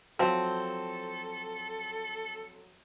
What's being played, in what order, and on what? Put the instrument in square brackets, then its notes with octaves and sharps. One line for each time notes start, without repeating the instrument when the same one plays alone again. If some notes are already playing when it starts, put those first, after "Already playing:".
[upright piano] F3 F#3 [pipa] C4 [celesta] F#4 F5 A5 [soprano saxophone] A4